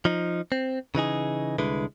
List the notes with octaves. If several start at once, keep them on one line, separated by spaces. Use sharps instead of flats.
F3 D#4
C4
C#3 E3 D#4 G#4
C2 D3 G#3 E4 B4